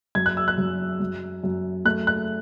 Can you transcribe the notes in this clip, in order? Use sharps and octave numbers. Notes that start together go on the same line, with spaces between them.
F#2 G#6
F#6
E6
F#6
F#2
F#2
F#2
A3 F#6
F#6